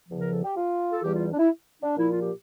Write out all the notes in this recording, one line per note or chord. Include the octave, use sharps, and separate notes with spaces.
E2 C#3 F3
A#4
A4
G4
F4
A4
E2 E3 G3 G4
F4
D4
E4
D4
A#2 F3 E4
F4
G4